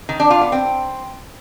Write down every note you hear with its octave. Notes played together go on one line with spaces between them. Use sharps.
D#3
D4
F4
B3
C4